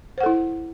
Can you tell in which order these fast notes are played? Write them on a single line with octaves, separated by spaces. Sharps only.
C5 F#5 A4 E4